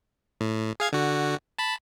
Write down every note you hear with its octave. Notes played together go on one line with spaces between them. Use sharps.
A2
G#4 F5 G#6
D3 F#4
A5 B5